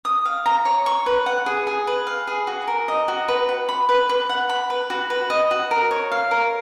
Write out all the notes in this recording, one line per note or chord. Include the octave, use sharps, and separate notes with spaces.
D#6
F5
A#5
C#5
C#6
B4
F#5
G#4
G#4
B4
F5
G#4
F#4
A#4
D#5
F#4
B4
F#5
B5
B4
B4
F#5
B5
B4
F#4
B4
D#5
F#4
A#4
C#5
F5
A#4